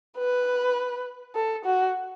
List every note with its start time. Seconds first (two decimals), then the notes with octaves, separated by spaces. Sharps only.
0.17 B4
1.35 A4
1.65 F#4